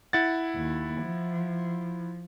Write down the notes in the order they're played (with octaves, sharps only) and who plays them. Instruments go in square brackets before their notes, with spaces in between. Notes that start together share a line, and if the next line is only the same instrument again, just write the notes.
[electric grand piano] E4 F#5 A6
[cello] D#2
F3